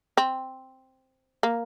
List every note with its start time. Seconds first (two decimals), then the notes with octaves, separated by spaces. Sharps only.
0.17 C4
1.43 A#3